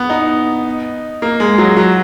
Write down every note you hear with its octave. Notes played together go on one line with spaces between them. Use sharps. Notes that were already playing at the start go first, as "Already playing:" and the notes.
Already playing: B3
D#4
A#3
G#3
F#3
F#3